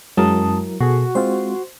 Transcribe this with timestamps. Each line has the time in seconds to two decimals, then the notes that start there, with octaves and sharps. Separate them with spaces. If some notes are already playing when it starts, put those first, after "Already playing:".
0.17 F#2 F#3 G#3 E4 A#4 A5 D#6
0.80 B2 F#4 G#4 A4 F#5
1.15 G#3 C4 F4 C5